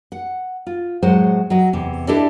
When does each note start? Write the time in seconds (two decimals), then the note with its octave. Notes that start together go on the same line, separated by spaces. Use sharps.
0.12 F#5
0.67 F4
1.03 A2 F#3 G#3 C5 F#5
1.50 F#3 D#5
1.73 E2 C3
2.08 D4 E4 G4 A4 D5 D#5